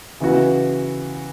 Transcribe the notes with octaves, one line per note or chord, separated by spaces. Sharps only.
C#3 E3 B3 F#4